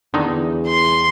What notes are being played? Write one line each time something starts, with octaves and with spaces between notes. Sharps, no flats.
E2 D3 D#3 D#4
C6